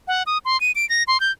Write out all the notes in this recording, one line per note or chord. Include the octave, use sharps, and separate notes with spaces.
F#5
D#6
C6
D#7
D7
A#6
C6
G6